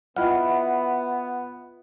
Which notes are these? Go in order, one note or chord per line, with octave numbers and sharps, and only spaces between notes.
B3 E4 F4 D#5 E5 F#5 G5